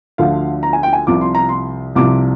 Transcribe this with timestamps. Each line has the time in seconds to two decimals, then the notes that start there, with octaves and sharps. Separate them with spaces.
0.18 D2 D3 F3 F5
0.63 A#5
0.73 G#5
0.83 G5
0.93 G#5
1.07 C2 C3 F3 D6
1.21 C6
1.35 A#5
1.49 C6
1.95 C2 C3 F3 D6